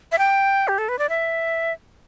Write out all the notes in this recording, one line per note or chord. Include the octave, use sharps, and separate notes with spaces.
E5
G5
G4
A4
B4
D5
E5